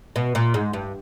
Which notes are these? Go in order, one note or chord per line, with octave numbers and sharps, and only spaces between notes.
B2
A#2
G#2
G2